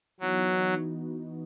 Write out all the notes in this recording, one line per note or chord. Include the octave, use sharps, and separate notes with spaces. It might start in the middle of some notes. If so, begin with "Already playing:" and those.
E3 F#3 B3 D#4 F#4
E3 B3 D#4 F#4